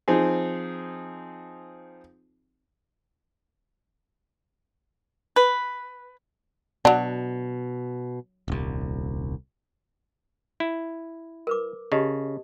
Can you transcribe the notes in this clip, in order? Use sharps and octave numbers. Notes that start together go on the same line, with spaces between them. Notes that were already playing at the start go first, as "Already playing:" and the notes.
F3 C4 D#4 G#4
B4
B2 F#3 D4
D#1 C2
E4
A#4 B4 D6
C#3 G4 D#5 A5